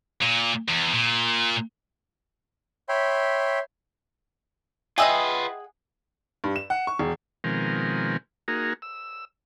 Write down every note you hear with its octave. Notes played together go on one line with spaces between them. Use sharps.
A#2
E2
A#2
C#5 E5 G5 B5 C6
F4 G#4 B4 D#5 E5 F#5 G5 D#6
G2
E7
F#5
C#6
E1
B2 D#3 F3 G#3 C4 A#4
A#3 D#4 F#4 G#4 A#4
E6